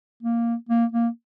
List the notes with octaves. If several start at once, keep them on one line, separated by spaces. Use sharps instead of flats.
A#3
A#3
A#3